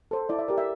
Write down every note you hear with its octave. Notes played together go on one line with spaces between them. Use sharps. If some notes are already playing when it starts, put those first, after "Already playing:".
A4 C5
E4 D5
E5
G4 A#4 D5
E5